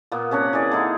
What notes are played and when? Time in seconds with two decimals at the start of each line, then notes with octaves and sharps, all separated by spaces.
0.12 A#2 A#3 B3
0.31 C3 C#4 D4 F#5
0.53 E3 G#4 D5
0.71 D3 A#3 D#4 E4